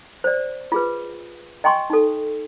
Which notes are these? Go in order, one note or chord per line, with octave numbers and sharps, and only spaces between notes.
C5 D5
F4 G#4 B4
D#5 G5 G#5 C6 C#6
D#4 A4